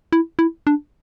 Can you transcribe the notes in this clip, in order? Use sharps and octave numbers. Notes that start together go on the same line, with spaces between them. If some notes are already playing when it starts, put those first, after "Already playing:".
E4
E4
D4